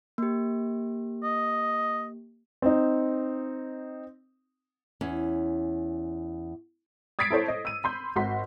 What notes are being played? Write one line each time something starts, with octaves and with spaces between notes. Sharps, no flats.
A#3 G4
D#5
C4 D#4
E2 C#4
D#6 G#6 A6 B6 C7 D7
E4 A4 C5 C#5
D#5
E6 D#7
B5 C6 G6
G#1 F#4 C6 B6